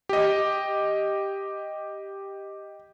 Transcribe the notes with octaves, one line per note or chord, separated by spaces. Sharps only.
G4 D#5